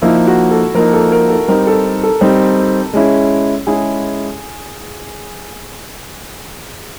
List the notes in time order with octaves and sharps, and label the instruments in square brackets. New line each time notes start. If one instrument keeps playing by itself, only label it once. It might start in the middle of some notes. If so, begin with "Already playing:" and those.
[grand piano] F3 A#3 D#4 [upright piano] E4
[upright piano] F#4
A4
[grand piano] F3 A#3 D#4 [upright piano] A#4
[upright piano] A4
A#4
A4
[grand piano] G3 C4 D#4 [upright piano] A#4
[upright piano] A4
A4
[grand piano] G3 C4 D#4
G#3 C#4 E4
[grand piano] G#3 C#4 E4 [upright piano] G#4